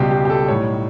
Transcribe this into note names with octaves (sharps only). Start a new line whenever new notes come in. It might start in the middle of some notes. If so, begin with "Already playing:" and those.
Already playing: C#2 B2 G3 G4
G4
G4
A4
B1 A2 G3 C#5